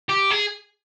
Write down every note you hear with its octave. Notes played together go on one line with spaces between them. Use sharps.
G4
G#4